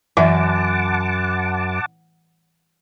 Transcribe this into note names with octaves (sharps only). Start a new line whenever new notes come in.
F#2 E3 E5 F#5 A5 D6